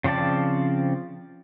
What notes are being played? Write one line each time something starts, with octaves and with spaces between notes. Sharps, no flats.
C#3 F3 C4 D5 A5